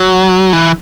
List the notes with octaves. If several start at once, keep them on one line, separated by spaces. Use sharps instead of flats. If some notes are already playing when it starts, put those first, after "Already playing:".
Already playing: F#3
E3